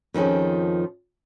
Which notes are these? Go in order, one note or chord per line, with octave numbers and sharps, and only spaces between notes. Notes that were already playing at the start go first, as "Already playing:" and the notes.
F2 D#3 F3 C#4 G#4